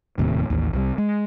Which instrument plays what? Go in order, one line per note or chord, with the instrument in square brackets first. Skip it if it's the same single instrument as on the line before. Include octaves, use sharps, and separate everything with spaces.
[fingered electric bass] E1 D#2 A2 C3
A1 D#2
C2 C3 G3
G#3